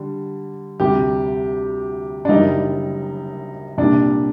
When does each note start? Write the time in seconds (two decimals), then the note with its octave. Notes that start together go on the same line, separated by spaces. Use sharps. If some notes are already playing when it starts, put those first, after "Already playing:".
Already playing: D3 G3
0.80 D2 C3 G3 G4
2.25 D4
2.29 F#1 F#2 D#3 G3 D#4
3.78 C2 A#2 G3 D4